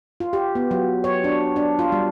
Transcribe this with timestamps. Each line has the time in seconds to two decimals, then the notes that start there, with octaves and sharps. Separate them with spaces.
0.20 F4
0.33 G4
0.55 B3
0.71 F#3
1.04 C#5
1.24 D4
1.56 D4
1.79 F4
1.92 G3